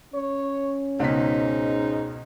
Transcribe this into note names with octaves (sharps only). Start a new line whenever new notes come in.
C#4 C#5
C#2 G#2 B2 D#4 B6